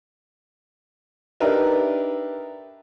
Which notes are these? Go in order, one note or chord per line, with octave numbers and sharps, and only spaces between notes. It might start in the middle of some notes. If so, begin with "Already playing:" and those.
D4 D#4 G4 A#4 B4 E5